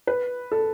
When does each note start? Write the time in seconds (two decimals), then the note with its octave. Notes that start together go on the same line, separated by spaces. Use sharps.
0.07 B4
0.52 A4